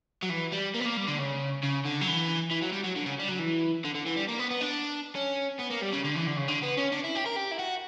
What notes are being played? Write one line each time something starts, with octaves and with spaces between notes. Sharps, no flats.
F#3
E3
G3
A#3
B3
A#3
G3
D3
C#3
C#3
D3
F#3
E3
E3
F#3
G3
F#3
D3
C#3
G3
F#3
E3
D3
D3
E3
G3
A#3
B3
B3
D4
C#4
B3
A#3
G3
C#3
D3
E3
D3
C#3
D3
B3
C#4
D4
E4
G4
A#4
G4
E4
F#4